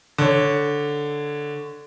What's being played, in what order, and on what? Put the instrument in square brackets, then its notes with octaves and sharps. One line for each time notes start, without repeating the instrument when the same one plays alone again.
[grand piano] D3 C#5